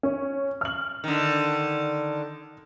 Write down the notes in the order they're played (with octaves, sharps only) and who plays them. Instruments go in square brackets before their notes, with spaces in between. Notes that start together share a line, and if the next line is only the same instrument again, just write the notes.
[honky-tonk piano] C#4
F6 F#7
[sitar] D3 D#3